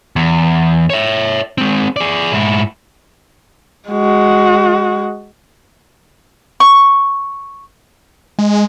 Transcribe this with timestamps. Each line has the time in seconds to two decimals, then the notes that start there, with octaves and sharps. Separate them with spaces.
0.16 E2
0.90 C#5 E5
1.58 G#3 C4
1.96 G#4 D5
2.33 G#2 E4
3.89 G#3 F#4
6.60 C#6
8.39 G#3